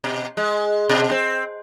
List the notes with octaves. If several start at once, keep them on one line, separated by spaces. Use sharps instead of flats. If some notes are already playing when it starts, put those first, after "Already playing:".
B2
G#3
B2
C4